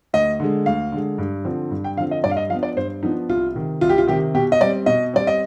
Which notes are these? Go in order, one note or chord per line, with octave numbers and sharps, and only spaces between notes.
D2 D#5
D3 G#3
D2 F5
D3 G#3
G2
D3 F3 C4
G2
G5
D3 F3 C4 F5
D#5
G2 D5
F5
D#5
F3 B3 D4 F5
D5
G2 C5
F3 B3 D4 D#4
C2 F4
C3 D#3
C2 F4
G4
F4
C3 D#3 G4
B2 G4
D#5
G3 C4 D5
B2 D#5
G3 C4 D5
D#5